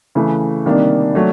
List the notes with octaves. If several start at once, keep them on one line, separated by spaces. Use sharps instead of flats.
C#3 E3 A3
C3 D#3 G3 A#3 D4
F#3 A3 D4